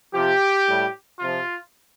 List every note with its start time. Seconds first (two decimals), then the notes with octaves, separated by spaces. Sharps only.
0.14 C3 F3 G4
0.67 A2 G3
1.20 C3 F3 F4